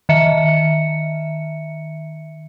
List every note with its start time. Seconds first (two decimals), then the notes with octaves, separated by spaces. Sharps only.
0.09 D#3 E5 C#7